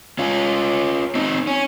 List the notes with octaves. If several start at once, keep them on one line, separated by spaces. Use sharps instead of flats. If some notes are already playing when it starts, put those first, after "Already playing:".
C#4 F4
C4 D#4
C#4